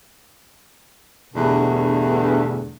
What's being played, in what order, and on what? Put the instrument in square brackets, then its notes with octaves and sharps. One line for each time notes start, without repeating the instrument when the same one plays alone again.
[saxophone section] E2 G2 B2 D3 A3